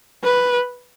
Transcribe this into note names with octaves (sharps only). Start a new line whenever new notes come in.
B4